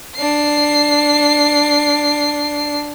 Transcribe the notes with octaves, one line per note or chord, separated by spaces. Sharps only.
D4 C7